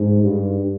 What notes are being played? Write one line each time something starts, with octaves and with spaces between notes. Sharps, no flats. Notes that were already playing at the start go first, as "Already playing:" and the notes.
Already playing: G#2
G2